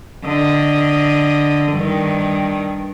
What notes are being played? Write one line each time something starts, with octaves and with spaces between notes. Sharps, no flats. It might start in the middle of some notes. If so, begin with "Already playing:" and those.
D3 D#5
G2 D#3